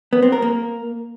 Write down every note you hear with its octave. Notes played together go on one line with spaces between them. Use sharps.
B3
C4
A#4
A#3